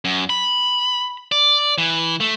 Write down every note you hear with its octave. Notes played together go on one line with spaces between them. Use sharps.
F#2
B5
D5
E3
A3